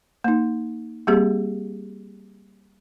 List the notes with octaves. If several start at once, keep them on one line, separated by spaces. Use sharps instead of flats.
A#3 D#4
G3 A#3 C4 G4 G#4